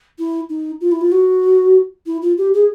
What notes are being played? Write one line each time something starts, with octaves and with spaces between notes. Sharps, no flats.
E4
D#4
F4
E4
F4
F#4
E4
F4
G4
G#4